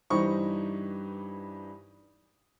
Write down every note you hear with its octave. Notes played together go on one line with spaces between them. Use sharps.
G2 E3 D#4 G4 C5 C#6